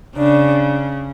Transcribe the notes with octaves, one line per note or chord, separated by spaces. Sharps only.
C#3 D4